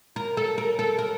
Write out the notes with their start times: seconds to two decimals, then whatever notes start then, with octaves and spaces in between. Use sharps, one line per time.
0.16 A#4
0.37 A4
0.58 A#4
0.79 A4
0.99 A#4